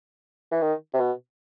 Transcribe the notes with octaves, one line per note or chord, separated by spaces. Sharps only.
E3
D#3
C3
B2